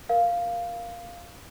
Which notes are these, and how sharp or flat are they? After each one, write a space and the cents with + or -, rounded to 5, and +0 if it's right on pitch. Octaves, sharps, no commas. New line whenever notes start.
A#4 +15 F5 +0